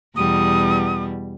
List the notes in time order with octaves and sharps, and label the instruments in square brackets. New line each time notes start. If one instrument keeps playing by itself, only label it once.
[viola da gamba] E2 B2 G3 [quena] D#6